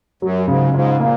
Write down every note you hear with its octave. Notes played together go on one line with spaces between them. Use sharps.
F#2 F#3
G#2 C#3
G#2 F4
A#2 A#3